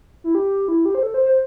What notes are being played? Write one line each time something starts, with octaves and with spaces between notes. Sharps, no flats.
E4
G4
E4
G4
C5
A4
C5
C5